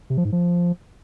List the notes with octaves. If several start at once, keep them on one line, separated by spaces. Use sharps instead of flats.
C3
F3
G#2
F3